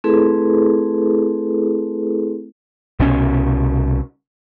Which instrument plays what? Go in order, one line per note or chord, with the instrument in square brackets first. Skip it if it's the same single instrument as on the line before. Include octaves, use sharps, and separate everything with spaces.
[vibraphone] A3 C4 E4 G#4 A4 B4
[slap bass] C2 B2 C#4